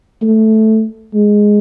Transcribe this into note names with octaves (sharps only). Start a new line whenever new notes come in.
A3
G#3